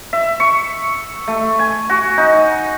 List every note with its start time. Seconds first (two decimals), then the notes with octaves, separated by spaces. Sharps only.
0.13 E5
0.40 C#6
1.28 A3
1.59 G#5
1.89 F#4
2.18 D#4